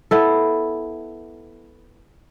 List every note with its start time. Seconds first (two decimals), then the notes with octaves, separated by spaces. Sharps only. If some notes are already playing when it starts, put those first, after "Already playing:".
0.11 B3 E4 A4